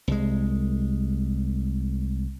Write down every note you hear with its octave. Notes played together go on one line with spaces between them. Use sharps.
C2 G#3